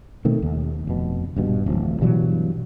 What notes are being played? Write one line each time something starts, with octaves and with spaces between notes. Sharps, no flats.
B2 D#3 A3 C4
D#2
F1 B2
D#1 G2 B2
D1 A1 F3
G2 B2 E3 F#3